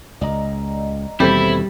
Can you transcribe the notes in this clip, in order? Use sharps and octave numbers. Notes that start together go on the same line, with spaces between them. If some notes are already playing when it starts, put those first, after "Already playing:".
C#2 D5 D#5 A#5
D#2 B2 E3 G3 C4 E4 A4 C5